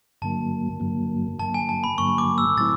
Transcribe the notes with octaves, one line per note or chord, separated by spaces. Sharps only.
G2 D3 F#3 A#3 A5
G2 D3 F#3 A#3
G2 D3 F#3 A#3 A5
G#5
A5
B5
G2 D3 F#3 A#3 C#6
D6
E6
A2 F#3 A3 C4 E4 A6